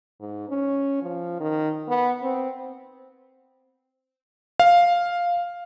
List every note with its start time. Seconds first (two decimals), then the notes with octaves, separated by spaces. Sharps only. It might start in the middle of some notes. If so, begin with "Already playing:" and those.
0.20 G#2
0.49 C#4
1.02 F3
1.40 D#3
1.89 B3
2.23 C4
4.60 F5